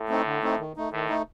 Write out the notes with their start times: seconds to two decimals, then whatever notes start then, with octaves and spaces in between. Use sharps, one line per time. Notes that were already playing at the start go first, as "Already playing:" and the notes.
Already playing: A2
0.09 A3 C4 D#4
0.25 D3
0.43 A3 C4 D#4
0.59 D#3
0.76 A3 D#4
0.92 A2 D#3
1.09 A3 D#4